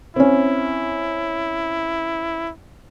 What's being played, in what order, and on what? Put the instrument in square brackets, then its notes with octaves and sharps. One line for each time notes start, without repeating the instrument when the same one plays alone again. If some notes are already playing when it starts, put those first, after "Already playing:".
[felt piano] C4 C#4 [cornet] E4